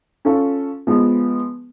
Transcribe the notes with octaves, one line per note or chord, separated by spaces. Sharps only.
C#4 F4 A4
F3 G#3 B3